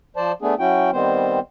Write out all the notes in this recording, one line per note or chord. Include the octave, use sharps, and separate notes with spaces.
F3 C5 D5 A5
A3 B3 D4 G#4
F#3 C#4 E4 F#4 G5
D#3 G3 B3 C4 C5